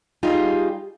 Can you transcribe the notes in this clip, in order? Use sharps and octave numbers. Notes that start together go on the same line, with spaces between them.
G3 D#4 F4 G4 G#4